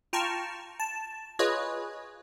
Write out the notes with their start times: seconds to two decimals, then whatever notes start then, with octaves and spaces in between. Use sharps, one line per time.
0.13 F4 G5 A5 A#5 C#6 F6
0.80 A5
1.39 F4 G#4 B4 C#5 D#5